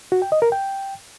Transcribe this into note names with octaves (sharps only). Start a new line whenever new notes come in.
F#4
G5
D#5
A#4
G5